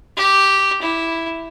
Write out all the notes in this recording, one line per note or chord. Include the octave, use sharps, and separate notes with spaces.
G4
E4